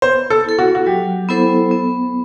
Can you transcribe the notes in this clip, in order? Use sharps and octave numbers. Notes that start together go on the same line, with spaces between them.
B3 C5
A4
E4 A4
F#4
F#4
F#3 G4
B3 E4 A4 C5
B3